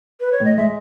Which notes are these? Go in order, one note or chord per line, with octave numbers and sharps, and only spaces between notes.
B4
C#5
A2 D#5
G#3 E5